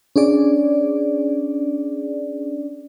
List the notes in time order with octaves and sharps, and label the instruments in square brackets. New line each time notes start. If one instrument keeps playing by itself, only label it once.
[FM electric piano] C#4 D4 G#4 D5